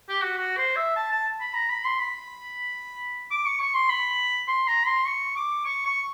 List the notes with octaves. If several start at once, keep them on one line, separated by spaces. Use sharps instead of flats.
G4
F#4
F#4
C5
E5
A5
A5
B5
A#5
B5
C6
B5
D6
C#6
C#6
C6
B5
C6
A#5
C6
C#6
D6
C#6
C#6